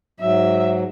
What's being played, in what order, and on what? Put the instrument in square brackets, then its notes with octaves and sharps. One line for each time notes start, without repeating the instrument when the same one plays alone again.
[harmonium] G#2 F#3 [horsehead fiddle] E5